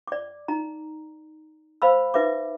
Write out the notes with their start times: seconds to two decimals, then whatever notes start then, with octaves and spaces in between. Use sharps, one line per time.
0.08 D5 D6
0.48 D#4 A#5
1.82 C5 F5 B5 E6
2.14 D#4 B4 E5 D6